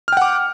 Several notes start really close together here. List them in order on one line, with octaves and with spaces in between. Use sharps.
F6 G5 F#5 D6